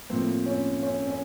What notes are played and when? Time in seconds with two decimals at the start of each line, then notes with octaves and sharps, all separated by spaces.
0.10 A2 F3 A#3 C4
0.46 C#4
0.83 C#4
1.07 C#4